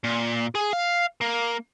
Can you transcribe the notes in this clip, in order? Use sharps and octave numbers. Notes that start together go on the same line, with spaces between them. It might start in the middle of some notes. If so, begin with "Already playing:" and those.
A#2
G#4
F5
A#3